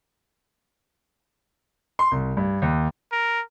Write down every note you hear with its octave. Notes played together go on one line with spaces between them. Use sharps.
C6
C2
G2
D#2
A#4